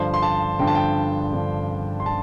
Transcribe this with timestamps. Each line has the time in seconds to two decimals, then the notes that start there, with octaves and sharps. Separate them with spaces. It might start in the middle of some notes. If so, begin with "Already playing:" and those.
Already playing: G2 D3 F3 D4 C5
0.14 C6
0.22 A5
0.59 G2 D3 F3 D4 G5
0.67 A5
0.75 G5
1.32 G2 D3 F3 D4
2.00 C6
2.06 D3 A5